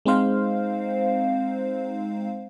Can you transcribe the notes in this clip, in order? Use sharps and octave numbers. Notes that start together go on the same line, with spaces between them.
G#3 C4 D#4 C5 F5